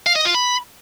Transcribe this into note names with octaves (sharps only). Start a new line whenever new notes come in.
F5
D#5
F4
B5